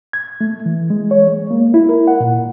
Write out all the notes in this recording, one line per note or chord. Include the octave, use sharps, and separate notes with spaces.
G#6
A3
E3
G#3
C#5
G#3
A#3
E4
A#4
F#5
A#2